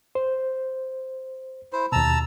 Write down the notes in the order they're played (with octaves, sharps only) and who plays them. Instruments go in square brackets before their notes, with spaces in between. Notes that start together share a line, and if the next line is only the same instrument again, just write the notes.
[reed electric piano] C5
[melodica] E4 C5
[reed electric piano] D#2 B2 [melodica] A5 A#5 E6